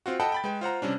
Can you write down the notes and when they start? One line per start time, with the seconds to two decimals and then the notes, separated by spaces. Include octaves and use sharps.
0.06 C4 F4 F#4
0.20 A4 D#5 F#5 G5 A5 B5
0.32 G5 B5 A6
0.44 G#3 B4 G5
0.61 F4 C5 F#5 A#5
0.82 C3 G3 C#4 D4